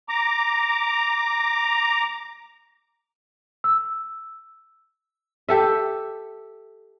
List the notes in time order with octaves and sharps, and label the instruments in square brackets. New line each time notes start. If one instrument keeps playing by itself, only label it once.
[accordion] A#5 D6
[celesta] E6
[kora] G4 A4 E5